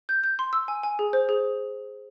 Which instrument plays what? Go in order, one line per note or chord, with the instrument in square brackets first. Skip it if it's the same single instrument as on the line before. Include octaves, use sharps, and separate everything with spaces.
[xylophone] G6
G6
C6
E6
G#5
G#5
G#4
C5
G#4